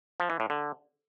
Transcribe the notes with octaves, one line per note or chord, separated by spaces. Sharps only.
F3
E3
A2
D3